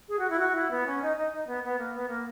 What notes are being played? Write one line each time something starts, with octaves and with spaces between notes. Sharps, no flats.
G#4
F#4
E4
F#4
E4
B3
C#4
D#4
D#4
D#4
B3
B3
A#3
B3
A#3